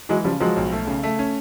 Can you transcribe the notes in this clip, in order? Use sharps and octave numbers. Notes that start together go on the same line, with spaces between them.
E3 F#3 G#3
C#3 F3 G3
F3 F#3 G#3
B1
A3
C#3
A3
C#4